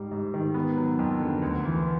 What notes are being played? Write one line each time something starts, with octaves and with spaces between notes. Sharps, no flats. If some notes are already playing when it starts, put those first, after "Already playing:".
Already playing: G#2 G3
G#2
D#3
B3
F#3
F2
D3
D2
E3